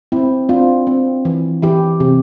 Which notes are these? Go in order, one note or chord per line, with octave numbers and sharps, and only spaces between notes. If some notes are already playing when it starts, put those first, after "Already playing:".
C4 E4
C4 D4 F4
C4
E3
E3 E4 G4
C3